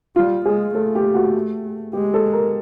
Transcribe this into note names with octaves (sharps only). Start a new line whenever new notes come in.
G3 F4
G#3 G#4
A3 A4
G4
F#4
G#3 G4
A4
A#4